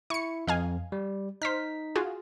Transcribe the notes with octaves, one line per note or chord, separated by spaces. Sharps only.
E4 C#6 C#7
F2 D#5 F5 G#5
G3
D#4 C5 F6 B6
F4 F#4 G#4